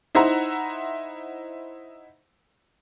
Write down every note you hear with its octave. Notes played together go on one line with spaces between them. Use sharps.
D#4 E4 C5 E5 F#5 A#5